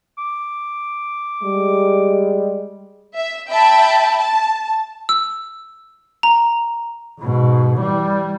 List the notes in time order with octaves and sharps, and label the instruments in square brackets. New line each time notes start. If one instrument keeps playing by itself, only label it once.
[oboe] D6
[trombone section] G3 G#3
[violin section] E5
E5 G5 A5 B5
A5
[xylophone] E6
A#5
[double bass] G#2 B2
E3 G3